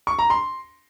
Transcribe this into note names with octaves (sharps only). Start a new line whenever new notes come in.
C#6
A#5
C6